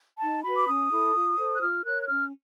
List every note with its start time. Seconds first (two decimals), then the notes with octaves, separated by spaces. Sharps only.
0.20 D#4 A5
0.44 F#4 B4 B5
0.56 D6
0.67 C#4 D#6
0.90 E4 A4
1.14 F4
1.37 A4 C5
1.55 F#6
1.61 F4 F6
1.84 A#4 C#5 F#6
2.02 F#6
2.08 C#4 F6